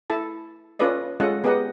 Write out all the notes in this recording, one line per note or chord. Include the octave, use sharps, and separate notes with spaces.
E4 A4 A5
C#4 F4 A4 B4 D5 D#5
G#3 C#4 F4 A4 D#5 F#5
B3 G4 G#4 A#4 D#5 F#5